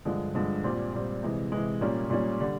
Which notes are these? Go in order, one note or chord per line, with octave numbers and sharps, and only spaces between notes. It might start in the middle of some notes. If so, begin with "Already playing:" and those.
G2 D3 F3 G#3
G2 D3 F3 G#3
A#2 G3 C4
A#2 G3 C4
C3 E3 G#3
C3 E3 G#3
A#2 G3 A#3 C#4
A#2 G3 A#3 C#4
D3 G3